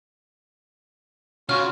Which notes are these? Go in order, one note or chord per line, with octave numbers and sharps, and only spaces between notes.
C#3 C#4 F4 F#4 F6